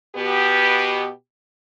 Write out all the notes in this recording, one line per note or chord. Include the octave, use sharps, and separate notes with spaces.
B2 B3 G4